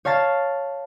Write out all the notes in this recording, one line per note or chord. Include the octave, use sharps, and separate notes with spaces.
C#5 F5 A5 A6